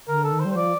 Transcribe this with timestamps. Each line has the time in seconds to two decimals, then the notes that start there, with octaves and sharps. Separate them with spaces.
0.08 D3 A#4
0.24 A4
0.32 D#3
0.40 C5
0.45 G3
0.51 C5
0.56 F3 D5